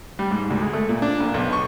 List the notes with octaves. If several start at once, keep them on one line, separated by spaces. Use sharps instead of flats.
G3
G#2
D2
G#3
A3
A#2
D4
A#1
B1
C#6